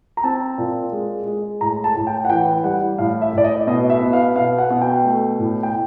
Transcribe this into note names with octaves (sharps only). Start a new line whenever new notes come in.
A#5
C4 A5
A#2
G#3
G#3
A2 A#5
A5
A2
G5
F#5
E3 G5
G3 F#5
A2 F5
E5
A2 D5
D#5
B2 D#5
E5
B3
F5
B2 F5
F#5
B2
G5
A3
A2
G5